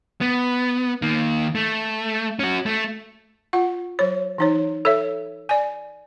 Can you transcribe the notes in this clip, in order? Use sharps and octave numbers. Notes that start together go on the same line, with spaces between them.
B3
D#3 A#3
A3
C#4 F#4
A3
F4 F#5
F#3 C#5
E3 D#4 C#5
A4 C#5 E5
D5 G#5